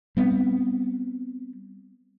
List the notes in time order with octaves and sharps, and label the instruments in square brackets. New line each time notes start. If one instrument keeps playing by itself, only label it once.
[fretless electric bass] G3 B3 C4